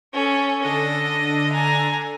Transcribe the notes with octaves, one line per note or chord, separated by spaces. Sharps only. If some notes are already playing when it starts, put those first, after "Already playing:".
C#4 A4
D3 D4 A4 D#5
G#5 A#5